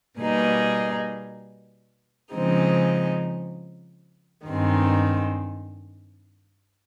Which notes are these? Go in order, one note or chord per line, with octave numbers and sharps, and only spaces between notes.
B2 G3 A#3 D#4 G#4
C#3 F3 G#3 C4 D#4
G2 D#3 G#3 C4